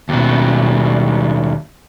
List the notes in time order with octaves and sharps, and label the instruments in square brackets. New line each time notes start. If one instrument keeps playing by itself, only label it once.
[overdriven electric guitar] D#2 B2